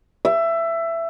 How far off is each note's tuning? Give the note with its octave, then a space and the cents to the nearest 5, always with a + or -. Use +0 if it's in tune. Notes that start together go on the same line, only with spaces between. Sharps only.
E5 +15